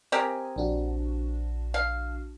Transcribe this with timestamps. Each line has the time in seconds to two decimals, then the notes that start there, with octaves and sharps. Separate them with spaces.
0.12 C4 G4 A#4 D#5 G#5
0.56 A#1 D4 F#4
1.74 F5